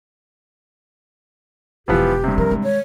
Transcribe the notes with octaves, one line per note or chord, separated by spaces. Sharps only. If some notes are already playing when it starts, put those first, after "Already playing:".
E1 D3 E3 F3 B3 G4
G2 C3
F3 A#4
D#3 G#3
C#5